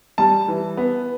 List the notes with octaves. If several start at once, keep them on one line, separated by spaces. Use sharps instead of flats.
G3 A5
E3
B3